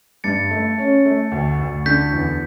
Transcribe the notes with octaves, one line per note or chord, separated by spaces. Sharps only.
G2 A6 C#7
A3
C#4
A3
D2
D2
D3 G6 B6
E2